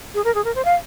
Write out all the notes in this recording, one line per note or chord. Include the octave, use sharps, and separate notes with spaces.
G#4
A#4
G#4
A#4
C5
F5